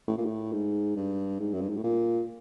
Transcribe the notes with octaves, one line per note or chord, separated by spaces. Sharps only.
A2
A#2
A2
G#2
G2
G#2
F#2
G2
G#2
A2
A#2